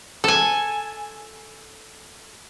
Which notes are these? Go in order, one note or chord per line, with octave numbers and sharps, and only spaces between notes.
A4 G#5